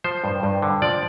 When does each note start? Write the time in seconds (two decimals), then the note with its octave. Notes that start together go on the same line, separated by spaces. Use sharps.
0.04 F3 C5
0.24 G2
0.43 G2
0.62 D3
0.82 F3 D5